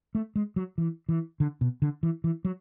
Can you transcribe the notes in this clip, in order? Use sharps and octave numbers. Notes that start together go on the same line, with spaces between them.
A3
G#3
F#3
E3
E3
D3
B2
D3
E3
E3
F#3